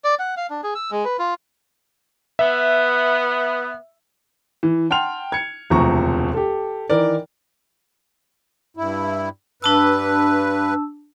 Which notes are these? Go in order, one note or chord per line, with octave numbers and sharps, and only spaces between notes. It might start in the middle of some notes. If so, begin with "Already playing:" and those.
D5
F#5
F5
D4
G#4
E6
G#3
B4
F4
B3 E5
E3
F#5 G5 A5 C6 F6 F7
G#6 C#7
E1 D2 C3 F3 A#5 C#6
G4 A4
D#3 E3 A#4 D5
G2 E4
G2 D4 B4 A5 E6